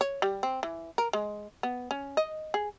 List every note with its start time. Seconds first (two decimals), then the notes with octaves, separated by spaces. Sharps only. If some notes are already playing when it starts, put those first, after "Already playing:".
0.01 C#5
0.22 G3
0.43 C4
0.63 E3
0.98 A#4
1.13 G#3
1.63 B3
1.91 C#4
2.17 D#5
2.54 G#4